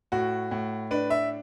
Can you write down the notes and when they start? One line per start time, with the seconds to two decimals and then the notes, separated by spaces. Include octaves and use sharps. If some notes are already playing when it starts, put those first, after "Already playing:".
0.12 A2 F#4
0.51 A2
0.91 D4 B4
1.10 E5